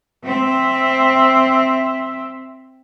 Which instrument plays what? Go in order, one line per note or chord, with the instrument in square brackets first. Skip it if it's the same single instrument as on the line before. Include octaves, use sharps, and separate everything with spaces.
[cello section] C4 E5